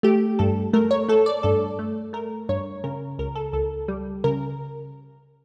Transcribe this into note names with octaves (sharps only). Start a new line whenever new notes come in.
A3 G4
G2 A4
A3 A#4
C#5
A3 A4
D5
G2 A4
A3
A3 A#4
G2 C#5
C#3 A#4
C#2 A#4
A4
C#2 A4
G3
C#3 A#4